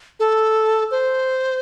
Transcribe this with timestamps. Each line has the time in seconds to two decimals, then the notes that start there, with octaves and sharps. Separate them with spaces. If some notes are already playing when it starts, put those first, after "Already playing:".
0.20 A4
0.91 C5